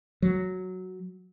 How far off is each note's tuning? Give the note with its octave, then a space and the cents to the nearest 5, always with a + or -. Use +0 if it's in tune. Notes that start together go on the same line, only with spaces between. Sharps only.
F#3 +0